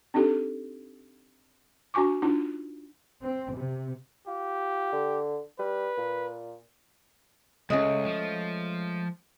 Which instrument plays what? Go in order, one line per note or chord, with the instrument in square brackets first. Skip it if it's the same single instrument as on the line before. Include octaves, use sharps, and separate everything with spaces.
[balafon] C4 D4 D#4 G4 A4
D4 F#4 G#5 C#6 D6
D4 D#4 F4
[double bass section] C4
C3
[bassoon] F4 [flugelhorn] G4
[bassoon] D3
[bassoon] G3 [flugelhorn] B4
[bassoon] A#2
[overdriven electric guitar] C#2 [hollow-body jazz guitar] G#3 A3 C#4
[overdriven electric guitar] F3